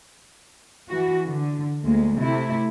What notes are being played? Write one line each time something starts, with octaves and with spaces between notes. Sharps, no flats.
E3 F#4
D3
D2 G#3 A#3
C3 A3 E4